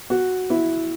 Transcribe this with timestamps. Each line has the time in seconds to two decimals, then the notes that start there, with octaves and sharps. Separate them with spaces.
0.10 F#4
0.50 E4